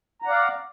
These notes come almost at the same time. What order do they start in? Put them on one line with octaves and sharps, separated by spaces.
A#5 F#5 D5 F5